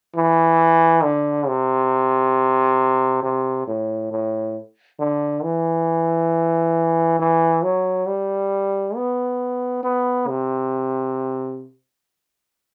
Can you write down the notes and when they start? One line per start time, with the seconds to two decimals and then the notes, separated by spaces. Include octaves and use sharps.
0.16 E3
1.03 D3
1.47 C3
3.23 C3
3.67 A2
4.11 A2
4.99 D3
5.43 E3
7.20 E3
7.64 F#3
8.08 G3
8.96 B3
9.83 B3
10.28 C3